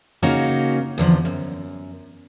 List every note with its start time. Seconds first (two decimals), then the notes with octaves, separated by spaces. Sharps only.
0.23 C#3 A#3 C#4 D#4 F#4
0.98 E2 D3 F3
1.25 F#2